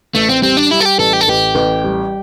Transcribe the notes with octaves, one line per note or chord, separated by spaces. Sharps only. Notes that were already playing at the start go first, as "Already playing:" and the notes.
A1 A3
C4
G3 C4
D4
G3 E4
A4
G4
A1 A4
G4
A4
A1 G4
A1
G3